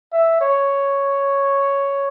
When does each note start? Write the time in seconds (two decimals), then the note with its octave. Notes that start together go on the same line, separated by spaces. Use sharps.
0.12 E5
0.41 C#5